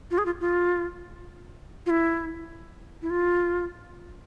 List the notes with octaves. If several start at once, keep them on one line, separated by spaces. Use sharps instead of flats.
F4
G#4
F4
F4
F4
E4
E4
F4